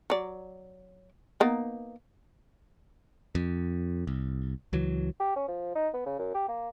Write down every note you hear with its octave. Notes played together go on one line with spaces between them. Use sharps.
F#3 D5
A#3 B3 D#4
F2
C2
C#2 E3 F#3
G4
C#4
F3
D#4
B3
C#3
F#2
G4
A#3